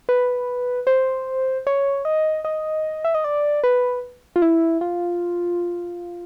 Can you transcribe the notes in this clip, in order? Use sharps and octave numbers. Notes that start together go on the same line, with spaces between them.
B4
C5
C#5
D#5
D#5
E5
D#5
D5
B4
F4
E4
F4